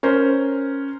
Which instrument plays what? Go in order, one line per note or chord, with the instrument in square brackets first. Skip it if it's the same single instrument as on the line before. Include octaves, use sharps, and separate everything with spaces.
[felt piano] C#4 A#4 C5